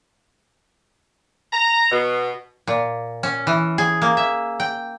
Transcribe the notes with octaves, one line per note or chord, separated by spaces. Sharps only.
A#5
B2
A#2
C#4
E3
G#4
A#3
E5
G5